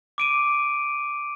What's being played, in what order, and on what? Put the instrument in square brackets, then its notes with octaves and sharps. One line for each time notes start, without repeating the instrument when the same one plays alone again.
[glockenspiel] D6 D7 D#7